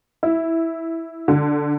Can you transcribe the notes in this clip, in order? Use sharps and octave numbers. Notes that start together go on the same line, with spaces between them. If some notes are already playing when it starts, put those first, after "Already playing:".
E4
D3